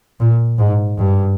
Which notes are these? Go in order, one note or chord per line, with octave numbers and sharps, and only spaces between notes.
A#2
G#2
G2